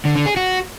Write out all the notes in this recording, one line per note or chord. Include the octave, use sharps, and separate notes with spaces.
D3
D3
G#4
F#4